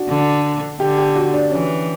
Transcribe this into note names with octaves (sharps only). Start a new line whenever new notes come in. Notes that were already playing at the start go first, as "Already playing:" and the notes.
Already playing: D4 F#4
D3
D3 G4
G4
F#4
D4
E3 C#4